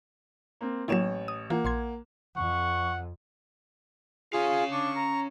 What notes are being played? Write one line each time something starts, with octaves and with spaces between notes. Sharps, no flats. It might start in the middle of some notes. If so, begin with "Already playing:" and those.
A#3 C4
A1 F#3 A#3 E4 C#5 E7
D#6
E3 A#3 F4 F#5
A#1 C6 G#6
F2 F#5 C#6
C#4 F4 G#4 F5
D4 C#6
A#5